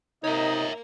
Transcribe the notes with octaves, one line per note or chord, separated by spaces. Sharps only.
C3 A#3 D#4 A#4 C#5 D#5 E5